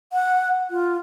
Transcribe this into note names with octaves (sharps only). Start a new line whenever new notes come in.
F#5
F4